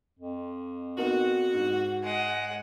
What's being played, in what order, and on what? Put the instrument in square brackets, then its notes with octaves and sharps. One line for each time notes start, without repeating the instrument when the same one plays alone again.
[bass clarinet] F2
[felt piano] A#3 B3 D#4 [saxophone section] F#4
[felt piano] G#2
[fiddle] G#3 F#5